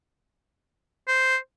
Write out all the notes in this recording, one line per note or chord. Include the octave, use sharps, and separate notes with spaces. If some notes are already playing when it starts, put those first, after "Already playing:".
C5